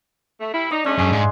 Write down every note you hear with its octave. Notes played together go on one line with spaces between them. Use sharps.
A3
G3 E4
D#4 D5
G#3 A3 C#4 D4
F#2 G#4 E5
G#2 F5 G#5 C6